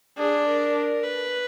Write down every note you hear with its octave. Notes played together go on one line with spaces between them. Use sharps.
D4 G#4
A#4
B4